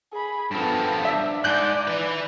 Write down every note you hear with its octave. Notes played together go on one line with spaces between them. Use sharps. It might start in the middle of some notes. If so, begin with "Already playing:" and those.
G#4 B5
G2 F3 B3 A4
D4 E5
G#2 D5 G#5 F#6 G6
E3 B4